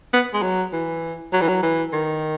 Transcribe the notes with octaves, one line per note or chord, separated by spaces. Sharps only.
B3
G#3
F#3
E3
F#3
E3
F#3
E3
D#3